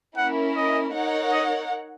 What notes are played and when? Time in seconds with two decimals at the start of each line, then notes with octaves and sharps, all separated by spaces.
0.17 A#3 C#4 E4 A#4 F#5
0.56 D#5
0.94 D#4 A#4 C#5 F#5
1.32 D#5